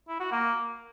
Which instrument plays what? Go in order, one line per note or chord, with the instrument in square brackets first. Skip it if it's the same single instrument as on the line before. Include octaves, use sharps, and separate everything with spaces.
[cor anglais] E4
F#4
A#3